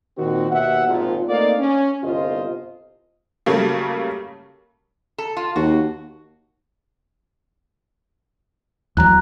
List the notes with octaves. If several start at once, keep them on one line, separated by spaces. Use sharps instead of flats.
A#2 D#3 C4 F#4
D#2 B2 E5 F#5
G#1 A#2 F3
A3 A#3 C4 D#4 D5 F5
C#4
G1 C2 F4 C5 D#5
C#3 F#3 G3 A3 A#3
A4
F4
D#2 F#4
E2 F#3 A#5 F#6